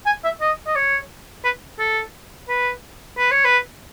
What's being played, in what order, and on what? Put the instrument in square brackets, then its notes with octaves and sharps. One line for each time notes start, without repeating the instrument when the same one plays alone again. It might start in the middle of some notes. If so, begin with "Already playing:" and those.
[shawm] G#5
E5
D#5
D#5
C#5
B4
A4
B4
B4
C#5
B4